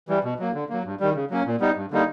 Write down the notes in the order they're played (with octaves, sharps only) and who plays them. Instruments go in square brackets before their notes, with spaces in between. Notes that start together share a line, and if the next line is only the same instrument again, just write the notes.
[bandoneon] E3 G3
B2
F#3 A#3
D3
F#3 A#3
G2
D#3 G3
C#3
F#3 A#3 C#4
A#2
G3 B3 D#4
G2
D3 G3 A#3 D#4